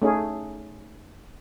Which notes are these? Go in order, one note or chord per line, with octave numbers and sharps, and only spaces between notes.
A3 C#4 D#4 G#4